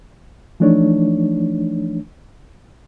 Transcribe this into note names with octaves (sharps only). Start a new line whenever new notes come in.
E3 F3 A3 D4 D#4 C#5